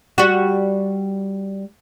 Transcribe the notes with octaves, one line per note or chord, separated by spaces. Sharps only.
G3 F#4